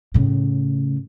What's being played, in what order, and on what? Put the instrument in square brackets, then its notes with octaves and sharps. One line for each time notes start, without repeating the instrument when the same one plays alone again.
[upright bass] A2 C#3